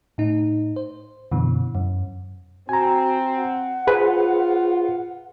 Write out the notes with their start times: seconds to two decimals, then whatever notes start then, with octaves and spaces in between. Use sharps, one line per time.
0.18 A2 D#4
0.76 C5
1.31 F#2 B2 D3 E3
1.75 F#2
2.69 C4 F#4 G#5 A#5
3.37 F#5
3.87 F4 G#4 B4 C5